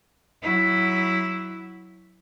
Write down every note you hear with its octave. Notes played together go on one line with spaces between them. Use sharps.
F#3 E4